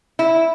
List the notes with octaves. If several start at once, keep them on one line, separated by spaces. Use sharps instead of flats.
E4